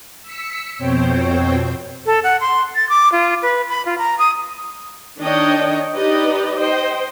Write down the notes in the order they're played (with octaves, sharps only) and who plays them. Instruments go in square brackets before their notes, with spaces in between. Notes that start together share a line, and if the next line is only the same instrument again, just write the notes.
[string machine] E6 B6 C#7
F2 B2 C4 C5 C#5 G5
[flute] A4
F#5
C6
A6
D6
F4
B4
B5
F4
A#5
D#6
[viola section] D#3 D4 C#5 D#5 G5
D#4 G4 B4 D5 D#5
C5 D#5 G5